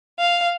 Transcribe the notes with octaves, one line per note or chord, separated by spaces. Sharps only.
F5